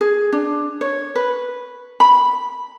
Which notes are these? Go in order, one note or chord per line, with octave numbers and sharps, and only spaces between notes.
G#4
D4
C#5
B4
B5